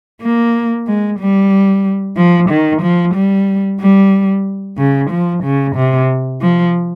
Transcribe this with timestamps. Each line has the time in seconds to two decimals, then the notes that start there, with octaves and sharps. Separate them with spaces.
0.22 A#3
0.87 G#3
1.20 G3
2.17 F3
2.50 D#3
2.82 F3
3.14 G3
3.80 G3
4.78 C#3
5.10 F3
5.44 C#3
5.76 C3
6.41 F3